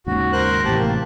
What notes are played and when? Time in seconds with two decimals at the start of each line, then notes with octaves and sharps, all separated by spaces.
0.07 D#2 G#2 C#3 F#4
0.33 A#4 C5 F#6
0.65 A1 A2 C3 G4 A5
0.78 A#3